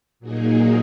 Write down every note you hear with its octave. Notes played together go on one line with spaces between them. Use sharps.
A#2 F#3 A#3 D#4 G#4